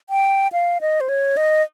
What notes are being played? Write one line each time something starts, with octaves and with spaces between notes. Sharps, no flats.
G5
F5
D#5
C5
C#5
D#5